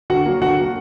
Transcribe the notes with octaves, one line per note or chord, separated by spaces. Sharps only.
D3 F#4 F#5
F#3 A#3
D3 F#4 F#5
F#3 A#3